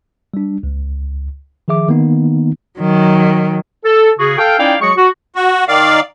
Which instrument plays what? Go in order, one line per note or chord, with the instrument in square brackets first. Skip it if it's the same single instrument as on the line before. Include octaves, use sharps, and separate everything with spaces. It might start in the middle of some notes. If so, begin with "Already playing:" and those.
[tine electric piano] G3 D4
C#2
D#3 F3 G#4 E5 D6
D#3 A#3 B3 D#4
[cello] D#3 F#3
[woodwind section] A4
C#3 F#4 G#4
A4 F5 G5
C#4 D#4 E4 D5 F5 G5
F#3 G#3 F#4 G#4 C#6
F#4
[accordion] F#4
D#3 D5 F5